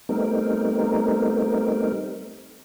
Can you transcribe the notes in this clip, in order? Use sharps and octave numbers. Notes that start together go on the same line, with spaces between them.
G3 A3 B3 C4 D#4 A#4